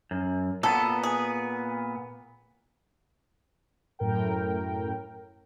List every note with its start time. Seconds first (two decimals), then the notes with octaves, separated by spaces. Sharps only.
0.11 F#2
0.63 A#2 B3 A4
1.03 G#4
3.99 F#2 A2 A#4 G5